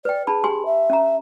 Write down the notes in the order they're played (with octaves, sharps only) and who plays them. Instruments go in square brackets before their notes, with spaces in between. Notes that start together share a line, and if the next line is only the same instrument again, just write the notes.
[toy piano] B4 G5 [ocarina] D5
[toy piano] D4 A5 B5 [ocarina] G#4
[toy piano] G4 G#5 C6
[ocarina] E5
[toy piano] C#4 A#5